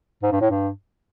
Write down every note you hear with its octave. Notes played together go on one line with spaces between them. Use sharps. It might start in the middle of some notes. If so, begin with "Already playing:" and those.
G#2
G2
A2
G2